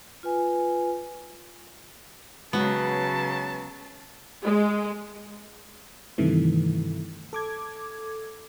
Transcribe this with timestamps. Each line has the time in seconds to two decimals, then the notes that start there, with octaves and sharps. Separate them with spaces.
0.23 F4 B4 G#5
2.53 C#3 F#3 G#3 B3 F#4 A5
4.43 G#3
6.18 G2 C3 D#3 E3 A3
7.33 A4 D6 G#6